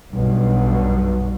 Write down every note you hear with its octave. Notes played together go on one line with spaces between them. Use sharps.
B1 G2 B2